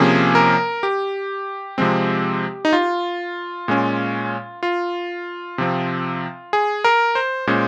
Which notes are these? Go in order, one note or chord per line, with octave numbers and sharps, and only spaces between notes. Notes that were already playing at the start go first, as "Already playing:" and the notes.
Already playing: C3 F3 A#3 C#4 G#4
A#4
G4
C3 F3 G#3 C4
D#4
F4
A#2 G#3 C#4
F4
C3 F3 C4
G#4
A#4
C5
A#2 G#3 C#4 C5